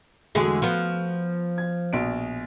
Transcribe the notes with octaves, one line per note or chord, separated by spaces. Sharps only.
E2 D3 G#3 A3 F#4
F3 B3
G#6
A#1 B2 D7